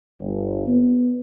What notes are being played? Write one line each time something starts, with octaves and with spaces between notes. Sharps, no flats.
G1
B3